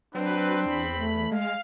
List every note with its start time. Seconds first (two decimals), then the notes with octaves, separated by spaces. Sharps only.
0.15 F#3 C4 D4 B4
0.66 E2 B5
0.97 A3
1.31 G#3 F5